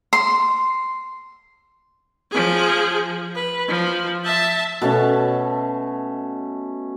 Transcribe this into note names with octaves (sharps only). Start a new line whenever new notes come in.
C6
F3 G#4
B4
F3
E5 A5
B2 A3 C#4